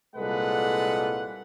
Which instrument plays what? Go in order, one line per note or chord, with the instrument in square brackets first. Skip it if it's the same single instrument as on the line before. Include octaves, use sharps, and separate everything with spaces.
[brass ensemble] C2 A#2 G#3 A4 B4 F#5